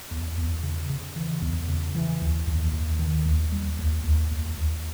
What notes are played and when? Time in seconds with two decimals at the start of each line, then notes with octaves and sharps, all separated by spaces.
0.11 E2
0.38 E2
0.63 C#3
0.90 C#3
1.16 E3
1.42 E2
1.68 C#3
1.95 E3
2.21 D#2
2.47 D#2
2.73 D#2
2.99 D#3
3.25 D#2
3.52 G3
3.79 D#2
4.04 D#2
4.31 D#2
4.58 D#2